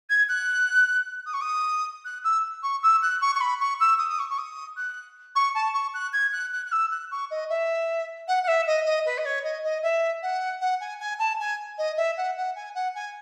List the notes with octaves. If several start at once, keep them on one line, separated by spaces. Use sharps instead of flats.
G#6
F#6
D#6
C#6
D#6
F#6
E6
C#6
E6
F#6
C#6
C#6
B5
C#6
E6
D#6
D#6
C#6
C#6
D#6
F#6
C#6
A5
C#6
F#6
G#6
F#6
F#6
F#6
E6
F#6
C#6
D#5
E5
F#5
F#5
E5
D#5
D#5
B4
D#5
C#5
D#5
D#5
E5
F#5
F#5
G#5
G#5
A5
G#5
D#5
E5
F#5
F#5
G#5
F#5
G#5